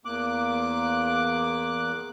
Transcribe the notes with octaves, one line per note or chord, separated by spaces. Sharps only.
E2 A#3 D6 F#6